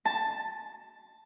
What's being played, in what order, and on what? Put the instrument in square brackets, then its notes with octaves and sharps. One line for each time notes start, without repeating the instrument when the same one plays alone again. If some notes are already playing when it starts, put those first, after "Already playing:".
[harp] A5